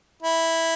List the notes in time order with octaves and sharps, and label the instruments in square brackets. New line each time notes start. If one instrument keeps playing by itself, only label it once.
[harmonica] E4